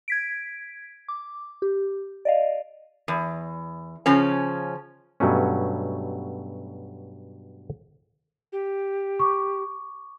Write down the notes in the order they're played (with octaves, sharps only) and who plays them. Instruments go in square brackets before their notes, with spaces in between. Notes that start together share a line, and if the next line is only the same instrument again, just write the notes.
[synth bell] G#6 B6 D7
D6
G4
D5 D#5 F5
[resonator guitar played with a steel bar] E2
C#3 F3 C#4
[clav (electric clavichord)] G2 B2 F#3 A3 C#4
[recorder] G4
[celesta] C#6 D6